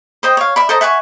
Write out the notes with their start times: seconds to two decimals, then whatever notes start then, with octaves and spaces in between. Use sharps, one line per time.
0.23 C5 D#5 G5
0.37 C#5 F5
0.56 D5 E5 B5
0.69 A4 C5 D#5 A#5
0.81 E5 F#5 G#5 C#6